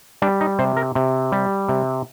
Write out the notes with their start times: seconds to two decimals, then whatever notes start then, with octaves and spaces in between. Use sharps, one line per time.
0.22 G3 D4
0.41 D#4
0.59 C3 C5
0.77 A#4
0.95 C3
1.32 G3
1.69 C3